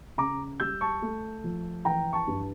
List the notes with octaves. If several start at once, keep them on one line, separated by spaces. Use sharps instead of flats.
C#3 A#5 D6
G3 E6 G6
A5 C#6
A3
F3
E3 G5 A#5
A5 C#6
G2